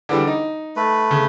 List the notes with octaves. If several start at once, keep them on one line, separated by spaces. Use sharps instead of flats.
D3 E3 G3
D#4
A3 B4
C#3